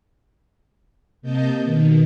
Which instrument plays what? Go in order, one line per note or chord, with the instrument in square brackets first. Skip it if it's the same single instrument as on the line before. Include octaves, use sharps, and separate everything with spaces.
[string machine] C3 A#3 D#5 A5 G6
B2 D#3